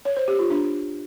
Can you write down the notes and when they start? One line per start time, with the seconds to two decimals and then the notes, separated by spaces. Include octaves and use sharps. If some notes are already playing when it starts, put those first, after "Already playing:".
0.05 C#5
0.17 C5
0.28 G4
0.39 F4
0.50 D4